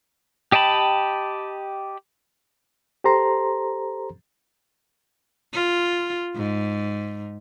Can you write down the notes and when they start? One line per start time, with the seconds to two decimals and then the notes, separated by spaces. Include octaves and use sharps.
0.52 G4 D#5 G5 A5 B5
3.04 G4 A4 C5 A#5 C6
5.53 F4
6.36 G#2